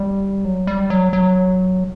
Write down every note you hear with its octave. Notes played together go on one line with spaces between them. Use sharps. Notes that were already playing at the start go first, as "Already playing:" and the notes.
Already playing: G3
F#3
G3
F#3
F#3